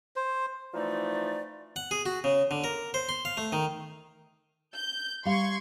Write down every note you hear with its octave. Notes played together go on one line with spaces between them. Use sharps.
C5
E3 F3 A3 D#4 D5
F#5
G#4
F#4
C#3
D3
A#4
C5
C6
F5
A3
D#3
G6
G3 F5 C6 C#6 G#6